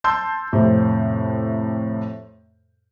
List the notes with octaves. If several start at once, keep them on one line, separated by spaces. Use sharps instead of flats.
A5 C6 E6 G6
F2 A2 C3